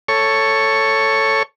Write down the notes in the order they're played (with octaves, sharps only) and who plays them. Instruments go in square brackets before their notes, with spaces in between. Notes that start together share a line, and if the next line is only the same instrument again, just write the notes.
[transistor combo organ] A4 C#5 C#6